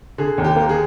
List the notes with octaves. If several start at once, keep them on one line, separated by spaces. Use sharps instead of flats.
D3 G#4
D#2
G4
A#3
G#4